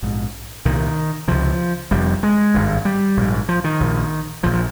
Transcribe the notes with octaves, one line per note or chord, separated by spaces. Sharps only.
A#1 G#2
C2 A#2 D#3
C#2 C3 F3
F1 F2 C3 G3
G#3
G#1 G2
G3
A#1 G#2
F3
D#3
A#1 A#2
A#1 A#2 F3
F3